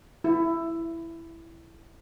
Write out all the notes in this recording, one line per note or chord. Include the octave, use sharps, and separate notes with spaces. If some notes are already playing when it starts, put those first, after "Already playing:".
E4